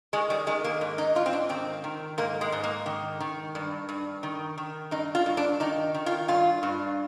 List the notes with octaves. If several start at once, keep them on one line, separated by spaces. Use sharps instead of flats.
D#3 G#3
G3
D#3 G#3
A#3
G#2
D#4
G#2 F4
C4
D4
D#3 C4
D#3
G#2 A#3
G#3
G#2
A#3
D#3
D#3
G2
G2
D#3
D#3
G2 D#4
F4
G2
D4
D#3 D#4
D#3
F4
G2 F4
G2